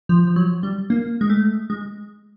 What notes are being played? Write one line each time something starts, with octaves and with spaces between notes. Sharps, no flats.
F3
F3
F#3
G3
A#3
G#3
A3
G#3